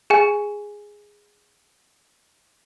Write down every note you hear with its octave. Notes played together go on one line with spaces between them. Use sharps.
G#4 G#5